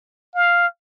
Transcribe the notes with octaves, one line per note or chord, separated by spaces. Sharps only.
F5